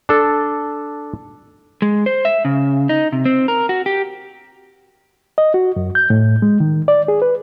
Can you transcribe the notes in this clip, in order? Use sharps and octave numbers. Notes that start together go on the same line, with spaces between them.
D4 A4
G#3
C5
E5
C#3
D#4
C3
C4
A#4
F#4
G4
D#5
F#4
F#2
G6
A2
G#3
D#3
D5
G#4
B4